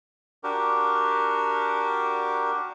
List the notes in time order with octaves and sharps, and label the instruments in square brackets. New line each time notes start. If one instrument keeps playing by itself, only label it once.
[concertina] D4 F#4 G4 A#4